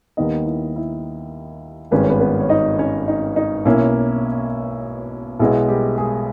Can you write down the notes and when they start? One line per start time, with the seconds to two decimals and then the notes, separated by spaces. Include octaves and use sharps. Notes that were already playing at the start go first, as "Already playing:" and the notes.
0.17 D#2 D#3 G3 B3 D#4 D#5
0.46 E4
0.76 E4
1.91 G#1 G2 D#3 G#3 C#4 B4
2.01 C#5
2.10 B3 B4
2.20 B3 B4
2.40 C#5
2.49 D#4 D#5
2.78 C#4 C#5
3.08 D#4
3.36 D#4
3.65 B1 B2 A#3 C#4 E4
5.39 B1 B2 G#3 B3 E4
5.69 G3 G4
5.98 G#3 G#4